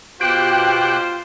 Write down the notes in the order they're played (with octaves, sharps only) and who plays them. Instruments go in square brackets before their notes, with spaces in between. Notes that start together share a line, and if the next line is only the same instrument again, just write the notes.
[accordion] B2 G4 F#6 [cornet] F4 [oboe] C5 [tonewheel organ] G5